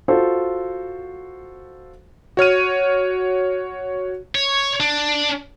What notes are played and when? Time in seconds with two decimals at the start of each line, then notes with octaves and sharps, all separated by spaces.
0.08 F4 F#4 A4 C5
2.37 F#4 C#5 F6 D#7
4.35 C#5
4.80 D4